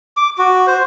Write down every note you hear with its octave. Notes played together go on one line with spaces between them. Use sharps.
D6
F#4
C5